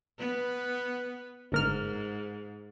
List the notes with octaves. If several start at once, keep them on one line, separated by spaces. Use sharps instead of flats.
B3 B4
G1 G#2 A#4 F6